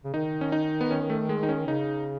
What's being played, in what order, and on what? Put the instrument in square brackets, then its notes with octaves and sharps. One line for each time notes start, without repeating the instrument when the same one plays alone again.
[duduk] C#3
[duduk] D#3 [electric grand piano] D#4
[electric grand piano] C#4
D#4
B3
C#4
A3
G#3
D#4
C#4
[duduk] C#3 [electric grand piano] D#4